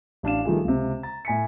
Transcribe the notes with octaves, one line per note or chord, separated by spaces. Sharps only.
A1 D4 F5 E7
D#3 F3 G3 A3 F4 G#4
C#2 C3
A#5 A6
A2 G#5 B6 C#7